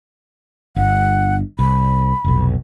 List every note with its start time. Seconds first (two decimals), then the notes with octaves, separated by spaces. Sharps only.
0.76 G1 F#5
1.59 C2 B5
2.24 F1 B1